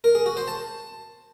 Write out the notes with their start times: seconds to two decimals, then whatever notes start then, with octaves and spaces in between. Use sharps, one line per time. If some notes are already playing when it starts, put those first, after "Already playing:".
0.04 A#4
0.15 G#4
0.26 F#4
0.37 C5
0.48 A5